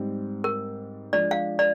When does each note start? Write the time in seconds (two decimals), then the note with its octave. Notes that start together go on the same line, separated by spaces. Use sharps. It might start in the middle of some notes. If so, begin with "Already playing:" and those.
Already playing: G#2 G3 C4
0.44 A#4
1.13 F3 G#3 D4 D5
1.31 F5
1.59 D5